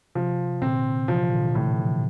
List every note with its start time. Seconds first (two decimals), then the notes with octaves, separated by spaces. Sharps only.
0.15 C3 F3
0.62 A#2 D3 C4
1.08 C3 E3 F3
1.32 A#2 D3
1.55 A2 C3 E3
1.79 D3 F3